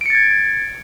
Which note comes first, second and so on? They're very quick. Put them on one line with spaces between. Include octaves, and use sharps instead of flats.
D7 C#7 A6 G#6